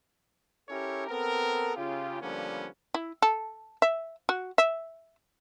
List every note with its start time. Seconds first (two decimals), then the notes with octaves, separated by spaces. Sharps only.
0.69 C#4 E4 G4 A4 A#4 C#5
1.08 B3 C4 A4 A#4
1.77 C#3 F4 G4
2.21 D3 F3 G3 A#3 B3 C#4
2.94 E4
3.22 A4
3.82 E5
4.29 F#4
4.58 E5